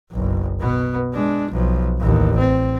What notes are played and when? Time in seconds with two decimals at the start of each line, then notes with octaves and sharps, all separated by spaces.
0.11 F#1 B1
0.60 B2 B3
1.13 G#3 D4
1.52 B1 F3
1.99 A1 D#2
2.38 C4